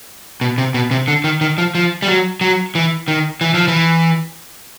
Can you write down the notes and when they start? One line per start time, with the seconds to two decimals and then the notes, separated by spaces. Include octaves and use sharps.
0.41 B2
0.58 C3
0.74 B2
0.91 C3
1.08 D3
1.24 D#3
1.41 D#3
1.58 F3
1.75 F3
2.02 G3
2.08 F#3
2.41 F#3
2.75 E3
3.08 D#3
3.41 E3
3.54 F3
3.68 E3